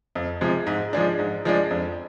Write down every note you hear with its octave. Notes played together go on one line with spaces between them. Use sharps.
F2
C3 F3 G#3
G#2
F3 G#3 D4
G#2
F3 G#3 D4
F2